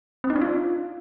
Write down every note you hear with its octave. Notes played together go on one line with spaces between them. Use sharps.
C4
D#4
D4
F4